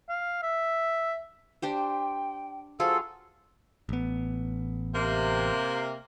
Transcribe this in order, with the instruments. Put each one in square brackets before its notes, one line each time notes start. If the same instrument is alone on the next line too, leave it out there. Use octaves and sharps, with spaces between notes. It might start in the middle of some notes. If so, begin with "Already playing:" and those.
[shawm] F5
E5
[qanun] D4 G4 C5 [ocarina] G5
[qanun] F#3 F4 G#4 [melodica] A4 [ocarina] C5
[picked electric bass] A1 B3
[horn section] C3 A#3